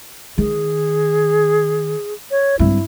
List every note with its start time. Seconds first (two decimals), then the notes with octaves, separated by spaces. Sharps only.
0.38 D#3 G#4
2.31 C#5
2.59 G2 C4 E4